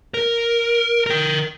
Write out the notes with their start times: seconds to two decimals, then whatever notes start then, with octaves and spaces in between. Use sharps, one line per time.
0.14 A#4
1.07 A#4 G5